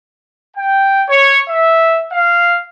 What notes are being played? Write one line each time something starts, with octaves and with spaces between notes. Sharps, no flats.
G5
C#5
E5
F5